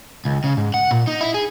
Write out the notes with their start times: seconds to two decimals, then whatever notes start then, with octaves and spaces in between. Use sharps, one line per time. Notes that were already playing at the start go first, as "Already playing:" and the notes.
0.25 C#2
0.44 C#3
0.57 G#2
0.74 F#5
0.91 A#2
1.07 D#4
1.21 E4
1.34 G#4